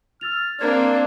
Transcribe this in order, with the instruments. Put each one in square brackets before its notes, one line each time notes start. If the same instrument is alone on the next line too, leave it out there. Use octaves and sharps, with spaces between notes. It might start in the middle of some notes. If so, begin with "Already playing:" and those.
[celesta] E6 A6 F7 [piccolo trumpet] F6
[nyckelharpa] A#3 C4 [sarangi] D4 [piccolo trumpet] C5 [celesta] F5 A#5 G#6